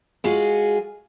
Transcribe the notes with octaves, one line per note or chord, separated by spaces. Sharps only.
G#3 F4 F#4 G#4